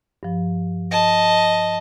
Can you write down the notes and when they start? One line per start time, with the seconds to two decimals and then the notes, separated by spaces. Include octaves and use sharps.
0.23 G2 F3
0.91 D#5 A5 A#6